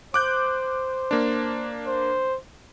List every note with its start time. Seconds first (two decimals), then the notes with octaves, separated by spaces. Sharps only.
0.14 C5 D6 F#6 G6
1.11 A#3 D4
1.87 C5